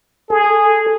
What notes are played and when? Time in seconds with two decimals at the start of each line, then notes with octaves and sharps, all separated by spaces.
0.30 G#4 A4